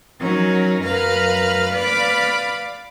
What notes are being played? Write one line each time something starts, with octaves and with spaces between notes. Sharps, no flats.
F#3 C#4 D#4 A#4
F#2 A#4 B4 F5 F6
B4 D5 F5 B5 D6